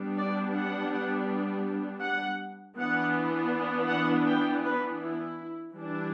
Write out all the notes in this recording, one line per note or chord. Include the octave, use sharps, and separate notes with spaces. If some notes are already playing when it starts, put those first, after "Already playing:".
Already playing: G3 B3 D4
D5
F#5
F#5
E3 B3 D4 F#5
F#5
G5
B4
E4
E3 G3 D4